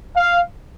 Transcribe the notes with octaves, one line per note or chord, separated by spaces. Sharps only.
F5